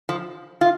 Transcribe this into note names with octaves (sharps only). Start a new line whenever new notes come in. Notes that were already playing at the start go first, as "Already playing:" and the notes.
F3
F4